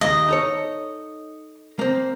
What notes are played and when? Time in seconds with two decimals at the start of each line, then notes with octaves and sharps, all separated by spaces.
0.01 D#2 D#3 D#5
0.28 D#4 A4 C#5
1.79 A#3 C4